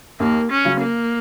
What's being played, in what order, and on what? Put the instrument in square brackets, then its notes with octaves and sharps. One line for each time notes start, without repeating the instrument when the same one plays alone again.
[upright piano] D#2 [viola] A#3
[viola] C#4
[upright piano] C#3 F#3
[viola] A#3